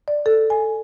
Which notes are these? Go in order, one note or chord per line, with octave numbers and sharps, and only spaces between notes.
D5
A4
G#5